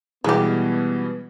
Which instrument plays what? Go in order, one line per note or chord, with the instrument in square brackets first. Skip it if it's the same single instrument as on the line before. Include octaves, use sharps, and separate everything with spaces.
[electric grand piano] B2 E3 G3 [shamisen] G#3 G4 [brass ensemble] B3